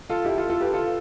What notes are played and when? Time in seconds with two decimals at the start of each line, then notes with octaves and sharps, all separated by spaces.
0.10 F4 A4
0.25 E4 G4
0.38 F4 A4
0.50 F4 A4
0.61 G4 B4
0.73 F4 A4